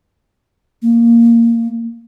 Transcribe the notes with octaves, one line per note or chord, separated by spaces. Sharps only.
A#3